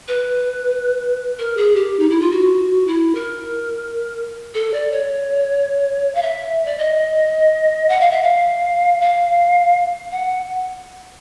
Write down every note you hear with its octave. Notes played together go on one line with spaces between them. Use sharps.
B4
A#4
G#4
G4
D#4
E4
F4
F#4
E4
A#4
A4
D5
C#5
F5
E5
D5
D#5
F#5
F5
E5
F5
F5
F#5